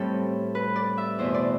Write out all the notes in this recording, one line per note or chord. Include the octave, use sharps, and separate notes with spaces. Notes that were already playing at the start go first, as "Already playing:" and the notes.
Already playing: A2 G3 C4 G4 A4
B4
D5
E5
E2 B2 A3 C5
D5